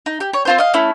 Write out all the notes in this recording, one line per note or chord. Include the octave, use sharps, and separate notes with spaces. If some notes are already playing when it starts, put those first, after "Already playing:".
D#4
G4
C#5
C4 F4 C5
D#5 F5
A3 C#4 E4